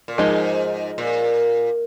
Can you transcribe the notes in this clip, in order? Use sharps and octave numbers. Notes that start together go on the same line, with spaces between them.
A#2
G#2 F3 G#3 D#4
A#2